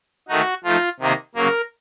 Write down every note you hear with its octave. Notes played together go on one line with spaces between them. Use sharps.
D#3 A3 D#4 F#4
F3 A3 D#4 F4
C3 D#3 A#3 D#4
C#3 F#3 A#3 A#4